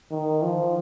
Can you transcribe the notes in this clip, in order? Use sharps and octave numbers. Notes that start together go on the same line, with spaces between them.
D#3
F3